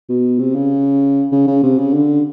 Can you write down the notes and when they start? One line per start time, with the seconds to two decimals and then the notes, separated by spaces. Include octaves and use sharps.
0.09 B2
0.39 C3
0.54 C#3
1.32 C#3
1.47 C#3
1.63 C3
1.78 C#3
1.94 D3